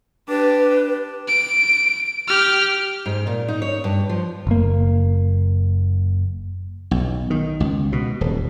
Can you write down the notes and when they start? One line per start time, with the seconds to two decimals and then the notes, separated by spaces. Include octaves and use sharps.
0.29 D4 G4 B4
1.28 D7
2.27 G4 F6
3.06 G#2
3.27 A#2
3.48 D#4
3.62 C#5
3.84 G2
4.09 F3
4.47 F#1 A#3
6.91 B1
7.30 D#3
7.60 C#2
7.92 B2
8.21 D#1